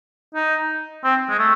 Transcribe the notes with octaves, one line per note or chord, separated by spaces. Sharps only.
D#4
C4
G#3
A3